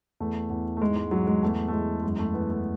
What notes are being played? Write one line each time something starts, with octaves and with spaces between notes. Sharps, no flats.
E2 A3
E2
A3
G#2 G#3
G#3
G#2 F#3
G#3
E2 A3
A3
E2 G#3
F#2 G#3
A3
E3 B3
A3